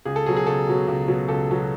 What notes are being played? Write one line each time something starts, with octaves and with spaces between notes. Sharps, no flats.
C#2 G#4
A4
B2 F#3 G#4
G#4
C#2 A4
B2 F#3
C#2
B2 F#3
C#2 A4
B2 F#3